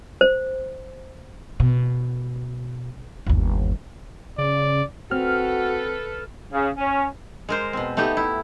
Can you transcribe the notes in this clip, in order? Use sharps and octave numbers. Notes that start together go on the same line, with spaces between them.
C5
B2
G1 D#2
C#3 D5
C4 F#4 A4 B4 F6
C#3
C#4
G#3 A#4 C5
B2 C4
A3 B3 D#4 G4
E4